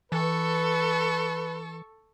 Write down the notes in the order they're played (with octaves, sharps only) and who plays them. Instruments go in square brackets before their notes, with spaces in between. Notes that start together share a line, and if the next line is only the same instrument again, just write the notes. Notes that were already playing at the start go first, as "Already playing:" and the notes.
[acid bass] E3 [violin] A4 C#6 [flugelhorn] B4